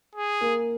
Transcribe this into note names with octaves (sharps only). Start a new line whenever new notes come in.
G#4
A#3